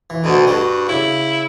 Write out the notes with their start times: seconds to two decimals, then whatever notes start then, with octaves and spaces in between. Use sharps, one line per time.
0.10 E3
0.24 D2 B2
0.47 G2 F#4
0.88 C#3 E4